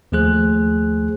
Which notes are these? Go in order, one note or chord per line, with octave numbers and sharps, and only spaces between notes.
D#2 F3 A3 G#4 C5 F#6